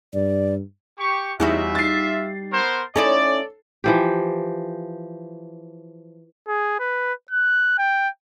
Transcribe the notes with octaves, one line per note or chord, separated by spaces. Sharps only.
G2 D5
G4 C#6
E2 G3 D#4 F4 F#4 E5
A6 C7
B3 A#4 C5
C#4 D#4 E4 A4 D5
E3 F3 G4
G#4
B4
F#6
G5